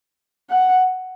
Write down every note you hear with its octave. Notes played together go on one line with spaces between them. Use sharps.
F#5